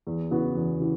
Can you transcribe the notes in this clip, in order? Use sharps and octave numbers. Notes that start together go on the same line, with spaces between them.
E2
C#3 E3 B3 F#4
E2
C#3 E3